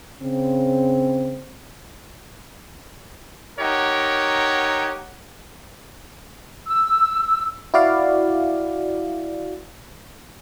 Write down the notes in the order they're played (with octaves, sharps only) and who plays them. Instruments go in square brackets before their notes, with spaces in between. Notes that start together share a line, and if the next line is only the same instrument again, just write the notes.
[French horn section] C#3 C4
[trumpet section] D#4 G4 A#4 C#5 F#5
[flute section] E6
[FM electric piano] E4 F#4 D5 F5